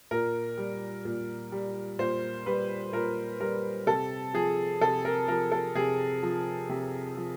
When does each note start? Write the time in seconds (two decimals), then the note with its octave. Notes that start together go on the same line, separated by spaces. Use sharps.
0.11 A#2 A#4
0.58 G3
1.05 A#2
1.52 G3
1.99 A#2 C5
2.46 G3 B4
2.93 A#2 A#4
3.40 G3 A#4
3.87 C3 A4
4.34 F3 G#4
4.81 C3 A4
5.05 A#4
5.28 F3 A#4
5.52 A4
5.75 C3 G#4
6.23 F3
6.69 C3
7.17 F3